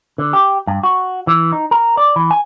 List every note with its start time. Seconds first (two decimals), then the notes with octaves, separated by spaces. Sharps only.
0.18 D3
0.33 G4
0.67 G2
0.83 F#4
1.27 E3
1.52 D#4
1.71 A#4
1.97 D5
2.16 E3
2.31 G#5